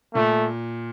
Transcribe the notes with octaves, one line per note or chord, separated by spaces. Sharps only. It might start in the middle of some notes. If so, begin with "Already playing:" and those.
A#2 A3